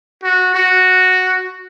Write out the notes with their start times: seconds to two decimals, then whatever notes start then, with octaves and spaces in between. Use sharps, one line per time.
0.23 F#4
0.54 F#4